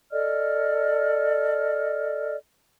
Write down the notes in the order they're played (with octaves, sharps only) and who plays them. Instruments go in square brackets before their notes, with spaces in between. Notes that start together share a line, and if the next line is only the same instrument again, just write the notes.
[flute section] A4 D5 D#5 F6